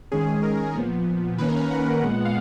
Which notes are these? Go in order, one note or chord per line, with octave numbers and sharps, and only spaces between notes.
D#3 G#3 C#4 G#4
A#4
A#2 F3 B3
D#3 A#3 C#4 B4
A#4
B4
F#5
A#2 G#3 B3
F5